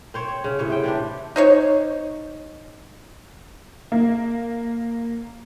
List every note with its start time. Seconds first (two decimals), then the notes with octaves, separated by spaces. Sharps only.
0.14 C4 C5 C#5
0.28 C#5
0.44 C#3
0.59 A2 C3 C#5
0.70 C5 G5
0.84 E3 D4 G4
1.36 D#4 C5 C#5
3.92 A#3